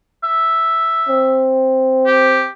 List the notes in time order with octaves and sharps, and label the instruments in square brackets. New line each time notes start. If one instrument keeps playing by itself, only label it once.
[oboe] E5
[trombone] C4
[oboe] G4